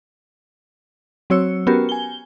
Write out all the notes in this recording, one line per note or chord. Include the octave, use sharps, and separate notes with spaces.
F#3 C4 F#4 C#5 E6 C#7
B3 C#4 F#4 G4 A#4
G#5 G7